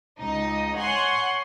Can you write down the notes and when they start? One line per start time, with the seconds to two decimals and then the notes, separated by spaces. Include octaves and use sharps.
0.20 C#2 D#4 D#5
0.76 C#5 F#5 G#5 C6